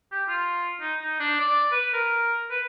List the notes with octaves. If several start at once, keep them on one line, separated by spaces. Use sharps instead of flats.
G4
F4
D#4
D#4
D4
D5
B4
A#4
B4